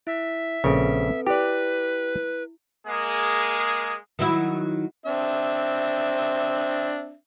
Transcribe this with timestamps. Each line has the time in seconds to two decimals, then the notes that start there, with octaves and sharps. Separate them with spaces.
0.07 E4 E5
0.64 A#1 C#3 C4 A4 B4
1.27 E4 G4 B4 D5
2.87 G#3 A#3 G#4
4.19 D#3 F#3 E4
5.06 C4 D4 E5